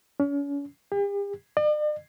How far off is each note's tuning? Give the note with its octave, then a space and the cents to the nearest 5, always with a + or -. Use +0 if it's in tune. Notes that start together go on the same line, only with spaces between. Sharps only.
C#4 +35
G4 +45
D5 +45